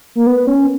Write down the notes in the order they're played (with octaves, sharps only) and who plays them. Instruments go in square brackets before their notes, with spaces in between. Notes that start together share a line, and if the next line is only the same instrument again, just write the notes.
[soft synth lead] A#3
B3
C#4